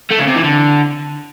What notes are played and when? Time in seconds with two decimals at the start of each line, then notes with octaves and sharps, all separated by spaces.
0.11 A3
0.19 C#3
0.27 C3
0.36 E3
0.44 D3